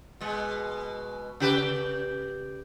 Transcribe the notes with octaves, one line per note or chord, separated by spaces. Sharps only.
B2 G#3
C#3 G4 B4